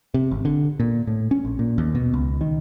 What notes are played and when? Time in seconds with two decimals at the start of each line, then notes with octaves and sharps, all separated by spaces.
0.14 C3
0.31 G#1
0.45 D3
0.80 A#2
1.07 A2
1.31 C#4
1.45 A#1
1.59 A#2
1.78 D#2
1.95 B2
2.14 C#2
2.41 D#3